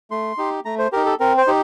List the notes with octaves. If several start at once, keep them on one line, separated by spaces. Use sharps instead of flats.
A3 C6
D#4 G4
A3 A#5
C5
D#4 G4 A#4
A4
C4 A#4
C5
D#4 G4